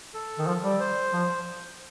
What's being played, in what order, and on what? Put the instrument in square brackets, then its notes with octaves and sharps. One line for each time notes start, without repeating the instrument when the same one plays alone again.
[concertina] A4
[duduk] D#3
F3
G3
[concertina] C5
[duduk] F3